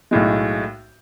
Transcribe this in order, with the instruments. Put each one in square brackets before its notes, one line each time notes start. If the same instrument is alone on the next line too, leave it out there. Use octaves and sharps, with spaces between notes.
[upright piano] B1 A2 G#3